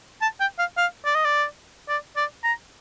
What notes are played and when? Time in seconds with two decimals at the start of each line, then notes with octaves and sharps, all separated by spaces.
0.22 A5
0.40 G5
0.59 F5
0.78 F5
1.05 D5
1.15 D#5
1.25 D5
1.89 D5
2.16 D5
2.44 A#5